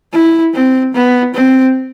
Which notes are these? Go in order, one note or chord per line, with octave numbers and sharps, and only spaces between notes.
E4
C4
B3
C4